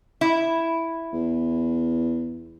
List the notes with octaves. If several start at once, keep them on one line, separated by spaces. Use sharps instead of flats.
E4
E2